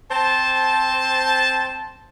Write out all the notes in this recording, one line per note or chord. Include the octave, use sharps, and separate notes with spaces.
C4 C5 A5